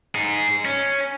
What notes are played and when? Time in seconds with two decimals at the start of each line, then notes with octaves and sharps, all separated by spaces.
0.15 D#4 G#4
0.65 C#4